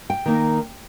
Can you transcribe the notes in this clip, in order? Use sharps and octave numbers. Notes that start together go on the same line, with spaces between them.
G5
D#3 A#3 D#4